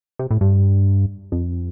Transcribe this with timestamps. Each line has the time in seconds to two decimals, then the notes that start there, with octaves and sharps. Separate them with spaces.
0.19 C3
0.31 A2
0.41 G2
1.32 F2